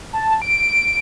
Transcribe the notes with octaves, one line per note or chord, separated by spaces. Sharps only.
A5
D7